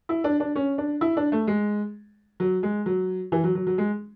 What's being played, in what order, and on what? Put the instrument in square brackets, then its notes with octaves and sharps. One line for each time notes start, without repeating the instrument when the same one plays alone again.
[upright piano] E4
D4
D4
C#4
D4
E4
D4
A3
G#3
F#3
G#3
F#3
E3
F#3
F#3
F#3
G#3